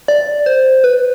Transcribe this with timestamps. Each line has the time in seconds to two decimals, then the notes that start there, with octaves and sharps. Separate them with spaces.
0.08 D5
0.46 C5
0.84 B4